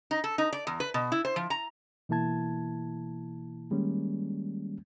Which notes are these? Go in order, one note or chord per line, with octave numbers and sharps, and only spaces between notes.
D#4
A4
D#4
D5
E2
B4
B2
E4
C5
F3
A#5
B2 E3 A#3 E4 A5 G#6
D#3 G3 G#3 A#3 C#4